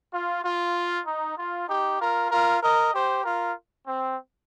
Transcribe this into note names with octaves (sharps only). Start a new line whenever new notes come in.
F4
F4
D#4
F4
D#4 G4
F4 A#4
F4 A#4
A#4 D#5
G4 C5
F4 A#4
C4